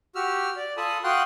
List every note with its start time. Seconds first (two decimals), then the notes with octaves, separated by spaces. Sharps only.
0.15 F#4 G4 E6 F6
0.56 D5
0.77 F4 A4 G#5 A5 B5 D#6
1.04 F#4 F5 G5 C6 D#6 F#6